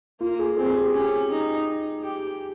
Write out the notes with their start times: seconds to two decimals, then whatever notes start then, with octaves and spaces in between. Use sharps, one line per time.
0.21 A#3 F4
0.39 G#4
0.57 C4 G#4
0.67 G#4
0.76 G4
0.93 C#4 G4
1.30 D#4
2.03 G4